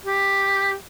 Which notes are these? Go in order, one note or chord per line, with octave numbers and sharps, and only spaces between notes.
G4